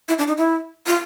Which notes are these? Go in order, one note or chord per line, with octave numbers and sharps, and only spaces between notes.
E4
D4
D#4
E4
F4